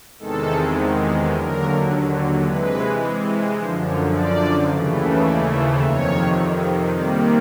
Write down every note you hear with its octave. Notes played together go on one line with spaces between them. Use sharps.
E2 C3 D#3 G#3 A4
D#2 D3 F#3 A#4
C3 E3 G#3 B4
F#2 D3 F3 C5
C#5
D5
D#2 C#3 E3 A3
D5
C5
F2 C3 D#3 C#5
C3 D#3 G3 A#3 D5